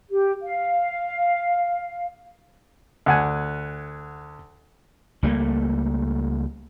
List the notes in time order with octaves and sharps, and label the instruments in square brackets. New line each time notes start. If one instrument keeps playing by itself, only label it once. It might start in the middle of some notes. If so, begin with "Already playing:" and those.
[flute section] G4
F5
[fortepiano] D2 F#5 G#5
[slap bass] C#2 G3 A3 A#3